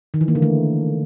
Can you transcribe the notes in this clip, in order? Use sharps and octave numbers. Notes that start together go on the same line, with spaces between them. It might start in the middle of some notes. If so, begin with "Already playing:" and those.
D#3
E3
A#3
D3
A3